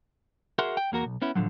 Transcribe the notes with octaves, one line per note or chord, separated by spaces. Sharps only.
F#4 G#4 A#4 E5 F#5 C6
G5
E2 A#3 F#4 A#4
B1
B3 C#4 E4
A2 D3 F3 F#3